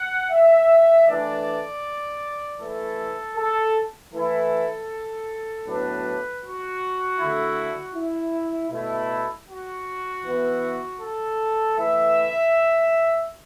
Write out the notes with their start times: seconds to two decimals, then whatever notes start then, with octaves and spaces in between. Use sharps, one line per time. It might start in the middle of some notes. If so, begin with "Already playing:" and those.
Already playing: F#5
0.31 E5
1.07 E3 A3 D4 D5
2.60 E3 A3 E4 A4
3.37 A4
4.13 E3 A3 E4 A4
5.66 A2 F#3 B3 D4 B4
6.42 F#4
7.18 D3 A3 E4
7.95 E4
8.70 B2 A3 E4
9.47 F#4
10.23 E3 B3 E4
11.00 A4
11.76 E3 A3 E4 E5